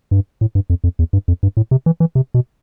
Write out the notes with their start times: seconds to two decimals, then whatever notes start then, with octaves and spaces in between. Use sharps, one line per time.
0.11 G2
0.41 A2
0.55 G2
0.70 F2
0.84 F2
0.99 E2
1.13 G2
1.28 F2
1.43 G2
1.57 A2
1.71 C3
1.86 E3
2.00 E3
2.15 C3
2.34 B2